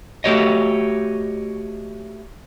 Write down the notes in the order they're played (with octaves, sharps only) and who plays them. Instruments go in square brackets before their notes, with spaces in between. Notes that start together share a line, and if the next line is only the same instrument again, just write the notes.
[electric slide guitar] A3 F#4 G4 C#5 D#5